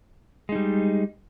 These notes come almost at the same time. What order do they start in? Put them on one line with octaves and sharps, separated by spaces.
G#3 D#4 G3